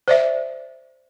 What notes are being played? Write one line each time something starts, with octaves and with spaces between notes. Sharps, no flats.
C5 D5 E5